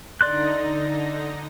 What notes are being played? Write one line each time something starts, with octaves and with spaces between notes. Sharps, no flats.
D3 D#4 D5 C6 F#6 A#6